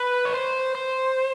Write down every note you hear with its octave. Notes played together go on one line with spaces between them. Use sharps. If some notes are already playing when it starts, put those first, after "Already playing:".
Already playing: B4
C#5
C5
C5